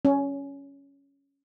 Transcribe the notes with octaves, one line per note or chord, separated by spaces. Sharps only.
C#4